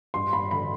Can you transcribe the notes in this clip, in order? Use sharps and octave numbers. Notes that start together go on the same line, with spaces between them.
G2 C6
B5
D3 B5